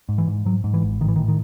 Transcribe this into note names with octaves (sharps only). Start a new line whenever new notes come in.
G#2
E3
G#2
G#2 F#3
G#2
E3
G#1
A2 D#3
E3
D#3
A2
D#3